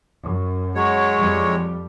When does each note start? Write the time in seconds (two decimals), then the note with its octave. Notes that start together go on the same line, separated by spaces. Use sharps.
0.23 F#2
0.75 F#3 G#3 C#5
1.17 F2 G3